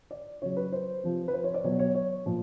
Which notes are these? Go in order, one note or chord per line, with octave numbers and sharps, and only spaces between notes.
D5
C#3 F#3 C#5
B4
C5
C3 F3
B4
C5
C#5
D5
B2 F#3 C#5
C#5
C#5
A#2 F3